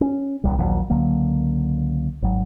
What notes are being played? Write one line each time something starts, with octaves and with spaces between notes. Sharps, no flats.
C#4
D#1 C2 G3
A#1 D#2 F#3
C#2 D3 F#3 A#3
G#1 F#3